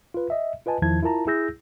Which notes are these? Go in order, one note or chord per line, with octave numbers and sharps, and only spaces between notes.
F4 B4
D#5 E5
F4 B4 D#5 G#5 A5
E2 D#3 F3 E4 A5 G#6
E4 F4 A#4 A5 A#5
E4 G#4 E6 G6 A#6